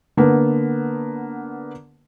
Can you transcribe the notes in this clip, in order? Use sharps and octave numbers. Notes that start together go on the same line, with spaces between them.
D3 A#3 B3